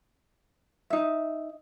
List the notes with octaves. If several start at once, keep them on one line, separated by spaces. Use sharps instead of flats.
D#4 E5